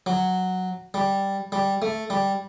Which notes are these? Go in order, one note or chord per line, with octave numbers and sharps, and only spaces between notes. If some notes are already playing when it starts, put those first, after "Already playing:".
F#3
G3
G3
A3
G3